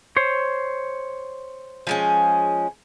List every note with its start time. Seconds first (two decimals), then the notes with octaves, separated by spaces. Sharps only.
0.16 C5 C#5
1.87 F3 G#3 C#4